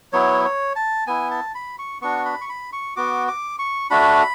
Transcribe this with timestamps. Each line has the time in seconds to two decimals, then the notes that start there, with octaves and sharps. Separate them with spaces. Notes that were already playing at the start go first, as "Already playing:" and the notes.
0.13 F#3 B3 E4 C#5
0.45 C#5
0.76 A5
1.07 B3 E4 G#5
1.31 A5
1.55 B5
1.79 C#6
2.01 B3 D4 F#4 C#6
2.25 B5
2.41 C#6
2.49 B5
2.73 C#6
2.96 B3 F#4 D6
3.28 D6
3.59 C#6
3.90 A3 D4 F#4 B5